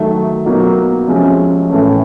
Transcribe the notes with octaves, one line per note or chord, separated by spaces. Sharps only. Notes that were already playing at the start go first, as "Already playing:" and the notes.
Already playing: D#3 F#3 A3
B2 F#3 A#3 D#4
C3 F3 G#3 C#4
A2 E3 A3 C#4